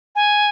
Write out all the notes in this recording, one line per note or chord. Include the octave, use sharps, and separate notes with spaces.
G#5